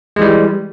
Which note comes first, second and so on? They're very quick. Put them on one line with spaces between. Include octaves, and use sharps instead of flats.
G#3 E3 G3